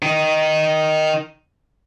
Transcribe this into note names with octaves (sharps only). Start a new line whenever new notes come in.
D#3 D#4